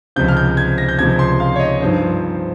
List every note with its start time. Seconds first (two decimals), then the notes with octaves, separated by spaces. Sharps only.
0.16 C#2 C3 F3 G6
0.28 F6
0.37 G6
0.57 G#6
0.78 A#6
0.89 G6
0.98 C#2 C3 F3 G#6
1.19 C6
1.40 F5
1.56 C#5
1.60 D#5
1.81 G2 F3 C4 D#4 C5